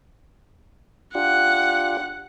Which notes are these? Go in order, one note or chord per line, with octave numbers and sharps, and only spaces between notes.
D4 F4 G4 F#5